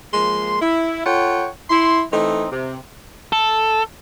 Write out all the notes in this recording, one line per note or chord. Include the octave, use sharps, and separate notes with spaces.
F3 G#3 A#3 C6
E4
F4 A4 C#5 F#5 G5
E4 C6
E3 A3 C4 D#4
C3
A4